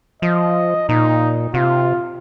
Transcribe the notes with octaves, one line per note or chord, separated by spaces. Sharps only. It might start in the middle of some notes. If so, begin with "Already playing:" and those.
F3 D#5
A#2 D#4
C3 F4